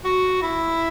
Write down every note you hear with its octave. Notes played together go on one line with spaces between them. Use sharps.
F#4
E4